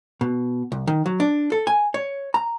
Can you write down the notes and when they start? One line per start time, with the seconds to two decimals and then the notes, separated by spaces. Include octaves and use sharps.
0.21 B2
0.72 C2
0.87 D#3
1.06 F#3
1.20 D4
1.52 A4
1.67 G#5
1.94 C#5
2.34 A#5